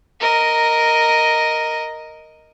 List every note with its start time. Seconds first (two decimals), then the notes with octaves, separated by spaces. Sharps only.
0.20 A#4 D#5